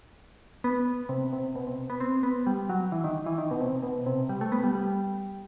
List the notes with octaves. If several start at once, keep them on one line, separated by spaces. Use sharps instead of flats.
B3
C3
C3
B2
C3
B3
C4
B3
G3
F#3
E3
D#3
E3
D#3
B2
C3
B2
C3
G3
A3
B3
G3
G3